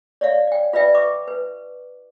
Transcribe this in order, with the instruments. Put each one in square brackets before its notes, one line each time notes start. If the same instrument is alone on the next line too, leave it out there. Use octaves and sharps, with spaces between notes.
[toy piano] C#5 D5 E5 F5
D5 G5
F4 B4 D5 E5 G5
B4 E5 C#6 D6
B4